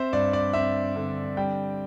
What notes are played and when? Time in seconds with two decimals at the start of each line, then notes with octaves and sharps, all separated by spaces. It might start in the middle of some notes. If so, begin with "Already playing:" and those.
Already playing: C4 C5 E5
0.13 G2 D5
0.33 D5
0.53 C4 E5
0.96 D3
1.37 G3 G5